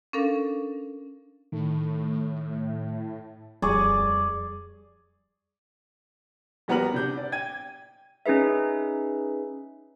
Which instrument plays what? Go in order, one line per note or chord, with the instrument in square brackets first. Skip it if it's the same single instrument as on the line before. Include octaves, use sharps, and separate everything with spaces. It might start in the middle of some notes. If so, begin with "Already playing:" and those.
[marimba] C#4 D4 A4 A#4 F5
[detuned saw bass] A2 [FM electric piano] D#3
[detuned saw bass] D1 [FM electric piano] F2 G3 [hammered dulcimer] G#4 D5 C#6
[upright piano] A#1 G3 B3 F#4 A#4 F#7
C3 D4 G6
D5
G5 G#6 D#7
[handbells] C#4 D#4 G#4 B4 E5